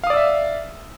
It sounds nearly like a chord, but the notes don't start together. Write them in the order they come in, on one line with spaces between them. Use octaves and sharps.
F5 D#6 D5 E6 E5